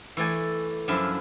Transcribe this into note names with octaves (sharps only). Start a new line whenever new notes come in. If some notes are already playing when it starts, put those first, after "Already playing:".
E3 A3 D5 G#5
F#2 F3 D4 E4 E5